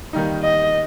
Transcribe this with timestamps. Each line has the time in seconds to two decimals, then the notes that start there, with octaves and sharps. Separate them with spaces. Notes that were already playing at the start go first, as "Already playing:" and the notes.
0.13 D#3 G3 A#3 D#4
0.42 D#5